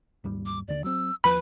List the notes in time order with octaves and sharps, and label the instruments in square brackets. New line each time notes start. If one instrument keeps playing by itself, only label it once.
[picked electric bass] D#2 G#2 G3
[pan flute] D6
[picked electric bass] D#2 D3 [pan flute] D5
[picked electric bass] F#3 C4 [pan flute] E6
[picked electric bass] D#2 F3 [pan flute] B4 [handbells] B5